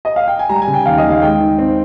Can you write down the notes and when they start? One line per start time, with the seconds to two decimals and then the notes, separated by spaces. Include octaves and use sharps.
0.05 D#5
0.16 F5
0.28 G5
0.39 G#5
0.49 G3 A#5
0.62 G#5
0.68 C#3
0.74 G5
0.86 D#2 F5
0.98 D#5
1.04 D#2
1.10 F5
1.22 G#3 G5
1.40 D#3
1.58 C4